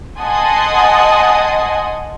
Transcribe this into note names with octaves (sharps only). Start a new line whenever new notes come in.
D#5 F#5 G#5 A5 C6 D#6